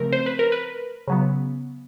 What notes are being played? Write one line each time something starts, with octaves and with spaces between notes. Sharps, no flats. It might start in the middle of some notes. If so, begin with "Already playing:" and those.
Already playing: C#3 F3 A3 C4 A#4
C5
B4
A#4
B4
C#3 F#3 B3